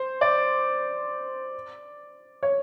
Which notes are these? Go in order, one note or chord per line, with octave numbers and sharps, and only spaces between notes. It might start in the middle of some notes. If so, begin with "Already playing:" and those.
Already playing: C5
D5
C#5